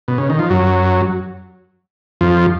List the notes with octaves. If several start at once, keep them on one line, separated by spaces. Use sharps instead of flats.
B2
C#3
D#3
F3
F#2 F#3
F2 F3